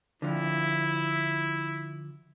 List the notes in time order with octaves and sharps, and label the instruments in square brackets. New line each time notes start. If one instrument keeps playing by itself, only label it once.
[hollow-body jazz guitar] D3 F3 [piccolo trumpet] E4